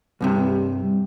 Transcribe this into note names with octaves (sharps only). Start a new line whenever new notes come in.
C2 G2 C3